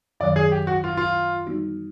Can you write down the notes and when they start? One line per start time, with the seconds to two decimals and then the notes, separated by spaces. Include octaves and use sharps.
0.20 F#2 D#3 F#3 D5
0.36 G#4
0.52 G4
0.67 F#4
0.84 F4
0.97 F4
1.46 E3 G3 B3 D#4 F#4